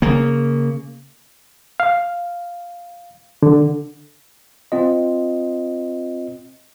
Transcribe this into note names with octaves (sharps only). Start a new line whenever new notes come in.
C#3 A#3
F5
D3
C4 F4 D#5